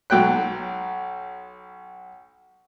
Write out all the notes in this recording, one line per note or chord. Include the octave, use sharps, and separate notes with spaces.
B1 F#3 G5 F#6